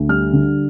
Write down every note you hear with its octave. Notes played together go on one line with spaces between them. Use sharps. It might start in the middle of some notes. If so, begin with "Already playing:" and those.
Already playing: D2
G3 F6
D3